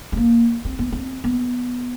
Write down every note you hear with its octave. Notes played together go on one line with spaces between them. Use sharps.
A3
A#3
C4
B3
C4
B3